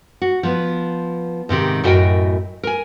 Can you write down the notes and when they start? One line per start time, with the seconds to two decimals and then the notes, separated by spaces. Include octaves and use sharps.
0.22 F#4
0.43 F3 B3
1.49 G#2 C3 D#3 G4
1.83 F#2 A2 F#4 A#4 D#5 G5
2.63 A#4 G#5